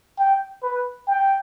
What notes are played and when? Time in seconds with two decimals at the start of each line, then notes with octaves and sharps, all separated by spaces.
0.19 G5
0.63 B4
1.08 G5